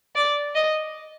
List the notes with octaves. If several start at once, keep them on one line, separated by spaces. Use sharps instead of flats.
D5
D#5